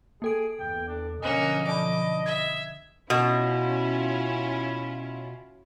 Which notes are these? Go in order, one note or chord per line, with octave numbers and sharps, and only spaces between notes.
A#3 G#4 A4 D7
E2 G5
D4
B1 D3 F3 A#3 C#4 D#5 G#5 F#6
D5 A5 B5 D6
E5 G#6
B2 C#4 E4 F4